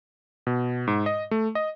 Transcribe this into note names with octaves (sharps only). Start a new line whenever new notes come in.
B2
G#2
D#5
A3
D#5